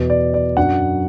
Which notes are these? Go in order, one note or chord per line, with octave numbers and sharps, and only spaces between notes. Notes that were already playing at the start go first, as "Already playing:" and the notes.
Already playing: E2 B2 B3
D5
D5
F#2 F#3 D4 F#5